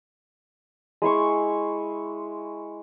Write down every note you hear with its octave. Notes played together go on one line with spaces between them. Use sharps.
G#3 E4 C6 C#6